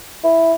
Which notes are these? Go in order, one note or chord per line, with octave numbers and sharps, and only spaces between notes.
E4